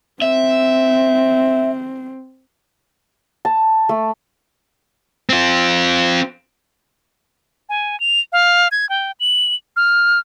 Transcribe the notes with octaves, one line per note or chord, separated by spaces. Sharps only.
C4 E5
A5
A3
C4 F4
G#5
F7
F5
G#6
G5
F#7
F6